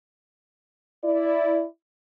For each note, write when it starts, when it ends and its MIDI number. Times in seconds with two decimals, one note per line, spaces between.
1.04 1.65 64
1.04 1.65 74